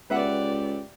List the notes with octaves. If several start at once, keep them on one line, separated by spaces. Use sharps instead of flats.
C#2 G4 B4 D5 E5 F#5